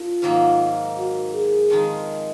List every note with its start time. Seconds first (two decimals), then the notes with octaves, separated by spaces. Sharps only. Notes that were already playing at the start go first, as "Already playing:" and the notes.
Already playing: F#2 D4 F4
0.22 G#2 D#3 F#3 A#3
0.97 F#4
1.34 G#4
1.70 F2 D#3 G#3 D#4